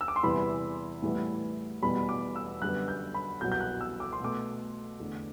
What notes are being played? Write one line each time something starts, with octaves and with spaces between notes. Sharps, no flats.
E6
D6
C6
E2 C3 E3 G3 B3 B5
A2 E3 G3 B3
E2 B2 G3 B3 B5
D6
E6
F#2 D3 G3 B3 F#6
G6
B5
C2 B2 F#3 G6
G6
F#6
E6
D6
C6
B2 A3 D6
E2 D3 A3